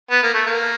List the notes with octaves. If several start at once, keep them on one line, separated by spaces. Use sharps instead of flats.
B3
A#3
A3
A#3